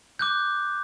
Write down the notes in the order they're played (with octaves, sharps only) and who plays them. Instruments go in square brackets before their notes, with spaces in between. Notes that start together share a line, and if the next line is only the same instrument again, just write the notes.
[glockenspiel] D6 F#6 G6